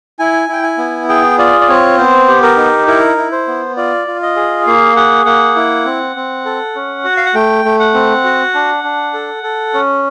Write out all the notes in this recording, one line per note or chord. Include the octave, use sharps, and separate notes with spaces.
E4 G#5
E4 G5
G#5
B3
G#4 G5
F4 D5
D5
C4 C#5
B3 C5
G4
A#4
D#4
E4 A#4
E4
C5
B3
F4 D5
F4
D#5
G#4
A#3 F5
G#4 F#5
A#3 F#5
E4
C4
C4
A4
C#4
F#4
F5
F#5
A3 G5
A3
F#5
C4
F#4
D4
D4
A4
A4
C#4